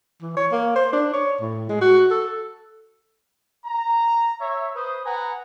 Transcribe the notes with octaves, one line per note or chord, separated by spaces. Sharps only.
E3
C#5
A#3
C5
D4
C#5
A2
G#3
F#4
A4
A#5
C#5 E5
B4 C5 D#6
B4 F#5 G#5 A#5